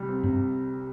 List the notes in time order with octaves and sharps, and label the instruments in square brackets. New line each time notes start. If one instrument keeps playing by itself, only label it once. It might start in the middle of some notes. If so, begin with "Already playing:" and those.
Already playing: [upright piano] C2 C3 G3
C4
[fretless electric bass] G2 [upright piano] C3